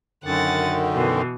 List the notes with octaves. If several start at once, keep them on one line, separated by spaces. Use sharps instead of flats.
F#2 D3 D#3 F#5 A6
B2 E3